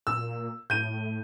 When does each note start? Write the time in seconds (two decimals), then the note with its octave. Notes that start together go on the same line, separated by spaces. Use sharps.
0.07 A#2 E6
0.70 A2 G6 D#7